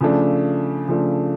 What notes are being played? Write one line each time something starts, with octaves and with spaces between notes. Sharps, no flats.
C#3 F3 A3 D4
C#3 F3 A3 D4